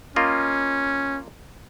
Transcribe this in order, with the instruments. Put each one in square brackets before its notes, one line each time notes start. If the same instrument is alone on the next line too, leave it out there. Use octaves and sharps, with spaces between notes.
[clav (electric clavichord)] A#3 F4 D#5 [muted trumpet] C#4